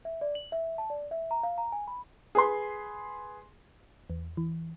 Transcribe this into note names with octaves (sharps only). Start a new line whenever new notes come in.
E5
D5
F#7
E5
A5
D5
E5
A#5
F5
A#5
G#5
B5
G#4 B4 C6
E2
E3